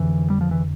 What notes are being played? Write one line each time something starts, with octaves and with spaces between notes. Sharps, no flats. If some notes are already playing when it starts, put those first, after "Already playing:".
Already playing: F2 D3 E3
G3
F3
E3